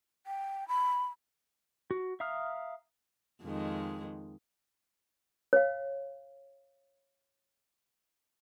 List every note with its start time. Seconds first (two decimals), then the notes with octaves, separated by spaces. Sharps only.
0.27 G5
0.68 B5
1.91 F#4
2.20 E5 F5 A#5 D#6 F6
3.42 F2 D#3 G#3
5.53 C#5 F5